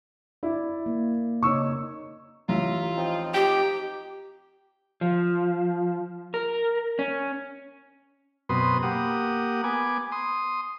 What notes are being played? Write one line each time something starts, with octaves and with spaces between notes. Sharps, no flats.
E4 D5
A#3
C#3 D#4 C#5 C#6 E6
A1 F4 E5 A#5
F3 C4 D#4
G4 G5
F3
A#4
C#4
F#2 B2 C4 B4 C6 D#6
A#3 G4 F#5 D#6
B3 G#5 D6
C6 D#6